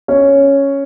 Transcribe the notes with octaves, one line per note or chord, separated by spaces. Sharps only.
C#4 C#5